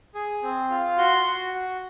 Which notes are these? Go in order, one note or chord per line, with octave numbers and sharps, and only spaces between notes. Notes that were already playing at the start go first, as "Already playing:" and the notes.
G#4
C4
F4
F#4 C6
F#4
F#4